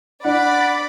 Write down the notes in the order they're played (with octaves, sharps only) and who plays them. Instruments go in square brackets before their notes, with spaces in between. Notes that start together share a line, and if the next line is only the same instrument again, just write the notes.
[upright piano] D4 [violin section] D5 B5 [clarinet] F#5